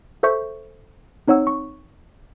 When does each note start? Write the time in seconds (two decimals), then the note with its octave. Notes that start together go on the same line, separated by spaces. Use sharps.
0.23 A4 C5 E5 C#6 G6
1.27 C4 D#4 C#5 F#5 E6
1.47 C#6